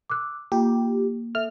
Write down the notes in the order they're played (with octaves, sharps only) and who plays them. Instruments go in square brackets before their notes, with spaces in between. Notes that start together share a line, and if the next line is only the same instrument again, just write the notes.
[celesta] D6 E6 F#6
[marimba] A#3 [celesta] F4 [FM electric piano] G4
[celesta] A4 E5 [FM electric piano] F6